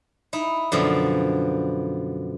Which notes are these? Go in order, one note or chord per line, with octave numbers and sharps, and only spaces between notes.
D#4 E4
F#2 B2 D3 F3 A#3